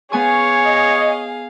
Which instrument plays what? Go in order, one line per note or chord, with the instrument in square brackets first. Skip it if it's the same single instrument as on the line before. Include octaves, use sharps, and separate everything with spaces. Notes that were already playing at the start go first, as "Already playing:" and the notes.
[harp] B3 G#5 C#6 [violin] G#4 F5 [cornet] C#5
[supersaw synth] D#5